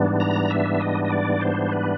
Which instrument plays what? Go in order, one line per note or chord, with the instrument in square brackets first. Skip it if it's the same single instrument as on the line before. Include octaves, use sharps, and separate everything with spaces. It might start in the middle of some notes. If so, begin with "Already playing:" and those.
Already playing: [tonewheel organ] G#2 E3 G3 B3 D4
A#5
E5
D#5
D#5
D5
C5
B4